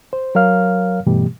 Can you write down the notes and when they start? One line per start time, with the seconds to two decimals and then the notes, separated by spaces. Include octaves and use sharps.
0.13 C5
0.35 F#3 A#4 C#5 F5 F6
1.06 G2 B2 E3 G3 A3 G4